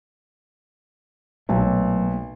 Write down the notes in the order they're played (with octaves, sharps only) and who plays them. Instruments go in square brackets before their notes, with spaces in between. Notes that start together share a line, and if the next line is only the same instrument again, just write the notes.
[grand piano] B1 [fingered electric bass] A#2 F#3 A3